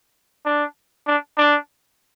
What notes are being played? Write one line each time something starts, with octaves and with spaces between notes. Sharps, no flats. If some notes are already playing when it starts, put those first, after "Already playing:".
D4
D4
D4